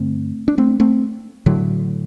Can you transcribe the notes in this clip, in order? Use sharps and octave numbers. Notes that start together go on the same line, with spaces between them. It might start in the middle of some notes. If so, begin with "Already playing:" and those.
Already playing: G2 D3 A3 C4
D4
A3 C4
A3 C4
A2 D3 F#3